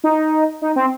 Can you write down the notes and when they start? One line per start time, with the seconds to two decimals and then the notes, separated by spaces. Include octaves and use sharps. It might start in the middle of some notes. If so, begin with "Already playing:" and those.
0.04 D#4
0.62 D#4
0.76 C4